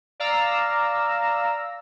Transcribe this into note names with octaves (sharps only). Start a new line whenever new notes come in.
D5 F5 A#5 E6